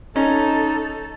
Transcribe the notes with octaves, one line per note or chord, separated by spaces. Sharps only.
C#4 D#4 A4